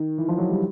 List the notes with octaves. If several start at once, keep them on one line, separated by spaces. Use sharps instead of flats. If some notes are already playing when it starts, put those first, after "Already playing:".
Already playing: D#3
E3
F3
F#3
G3